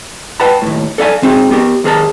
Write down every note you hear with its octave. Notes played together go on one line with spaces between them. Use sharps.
B4 F#5 G5 A5 B5
D#2 A2
A4 D5 F5 G#5
C4 D#4 F#4 G#4
B3 G4 A#4
D#2 G#4 A#4 A5